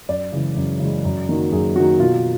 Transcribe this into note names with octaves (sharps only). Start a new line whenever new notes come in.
F#2 D5
C#3 E3 G#3
F#2
C#3 E3 G#3
F#2
D#3 F#3 A#3
F#2 G#4
D#3 F#3 A#3 F#4
B2 F4